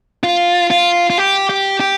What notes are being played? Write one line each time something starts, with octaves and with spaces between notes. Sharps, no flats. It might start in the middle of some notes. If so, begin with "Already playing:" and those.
F4
F4
F4
G4
G4
G4